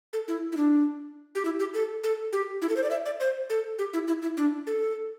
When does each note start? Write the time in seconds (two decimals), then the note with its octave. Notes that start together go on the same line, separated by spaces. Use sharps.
0.13 A4
0.28 E4
0.52 E4
0.57 D4
1.35 G4
1.45 E4
1.60 G4
1.74 A4
2.04 A4
2.33 G4
2.62 E4
2.69 A4
2.77 C5
2.83 D5
2.91 E5
3.06 D5
3.20 C5
3.50 A4
3.79 G4
3.93 E4
4.08 E4
4.22 E4
4.37 D4
4.67 A4